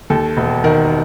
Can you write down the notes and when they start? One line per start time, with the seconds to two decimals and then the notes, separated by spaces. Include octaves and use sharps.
0.10 D#2 A4
0.37 E1
0.64 D#3 A#4